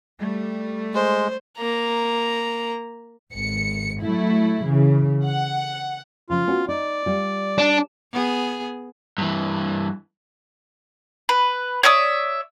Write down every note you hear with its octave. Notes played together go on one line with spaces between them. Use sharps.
G3 A3
G#3 C5
A#3 A#5
G#1 C#7
F#3 A3 E4
C#3 E3
F#5
C#3 F3 F4
B3 C#4 F#4
D#4 D5
G3 F4
D4
B3 G#4
G2 E3
B4
C#5 D5 E5 D#6